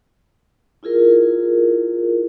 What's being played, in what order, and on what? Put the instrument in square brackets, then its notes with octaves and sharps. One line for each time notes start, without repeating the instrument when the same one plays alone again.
[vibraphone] E4 F4 G#4 A#4